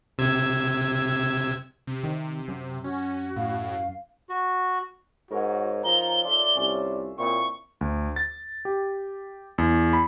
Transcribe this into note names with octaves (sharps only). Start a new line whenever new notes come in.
C3 E6 G#6
C3
D#3
F#2
C#4 F#4
A2 F5
F#4
G#2 F#4 A#4 C#5
F3 D#4 A#5 G7
F4 A4 D5 E5
C2 C#4
A#2 C4 E4 C#6
D2
A6
G4
E2
B5